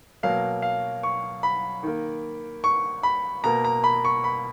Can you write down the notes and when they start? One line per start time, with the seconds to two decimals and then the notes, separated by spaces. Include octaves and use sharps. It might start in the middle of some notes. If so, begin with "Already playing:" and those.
0.23 B2 F#3 A#3 F5
0.62 F5
1.03 C#6
1.43 B5
1.83 D#3 A#3
2.64 C#6
3.03 B5
3.44 B2 A#3 A#5
3.65 A#5
3.84 B5
4.05 C#6
4.24 B5